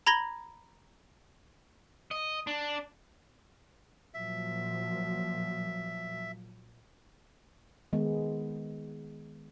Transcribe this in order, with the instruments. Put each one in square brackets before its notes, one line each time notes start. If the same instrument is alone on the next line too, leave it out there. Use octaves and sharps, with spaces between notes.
[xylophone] A#5 B5 G#6 A#6 F#7 G7
[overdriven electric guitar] D#5
D4
[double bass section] A#2 F3 F#3 [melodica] E5
[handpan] D#3 G#3 B3